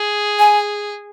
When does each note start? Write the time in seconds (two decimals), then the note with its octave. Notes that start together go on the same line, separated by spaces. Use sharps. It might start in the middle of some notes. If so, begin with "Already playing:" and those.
Already playing: G#4
0.39 G#5